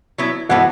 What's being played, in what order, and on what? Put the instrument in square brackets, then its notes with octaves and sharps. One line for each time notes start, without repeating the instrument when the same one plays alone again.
[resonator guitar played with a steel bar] F#3 B3 E4
[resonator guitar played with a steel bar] E3 G#3 B3 F#4 A4 [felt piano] F#5